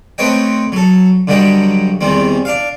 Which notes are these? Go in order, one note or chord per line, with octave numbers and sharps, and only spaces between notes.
A3 C4 B4 C#5 D#5 G5
F#3 A4
G2 D3 F#3 G3 D#5 G5
E2 D#3 G3 C4
D4 F5